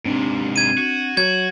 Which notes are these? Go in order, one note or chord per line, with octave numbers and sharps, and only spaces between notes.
G#2 C3 C4 D4
G#6 D#7
F#4
F#3 F#4 G#6